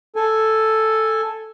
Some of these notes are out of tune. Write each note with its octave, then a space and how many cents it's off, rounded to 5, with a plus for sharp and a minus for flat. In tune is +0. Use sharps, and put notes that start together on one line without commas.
A4 +0 G#5 +0